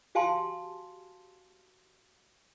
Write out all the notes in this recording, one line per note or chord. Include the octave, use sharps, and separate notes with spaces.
F#4 G4 F5 G#5 A5 C6